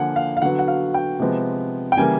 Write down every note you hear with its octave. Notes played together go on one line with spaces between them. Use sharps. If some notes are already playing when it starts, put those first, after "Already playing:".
Already playing: D3 F3 A#3 F#5 G#5
F5
F5
D3 F#3 B3 F#5
F#5
F5
G5
C3 F3 G#3 B3
G5
C#3 E3 G3 A#3 G#5